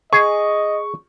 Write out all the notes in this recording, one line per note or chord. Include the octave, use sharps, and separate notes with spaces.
G#4 D#5 C#6